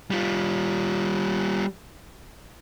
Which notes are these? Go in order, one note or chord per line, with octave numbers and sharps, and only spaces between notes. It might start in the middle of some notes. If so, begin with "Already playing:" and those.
G3 F4